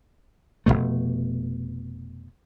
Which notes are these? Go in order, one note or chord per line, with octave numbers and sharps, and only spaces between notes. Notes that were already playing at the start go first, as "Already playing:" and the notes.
F1 F2 B2 A3